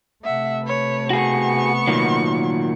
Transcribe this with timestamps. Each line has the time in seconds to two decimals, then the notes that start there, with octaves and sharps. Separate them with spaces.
0.24 C3 A3 E5 F#5
0.63 B4 C#5
1.10 B3 F#4 G#4 C#6
1.87 A#2 D#3 F#3